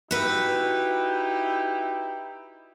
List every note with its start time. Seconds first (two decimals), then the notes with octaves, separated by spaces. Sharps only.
0.11 D#4 E4 F#4 G4 B4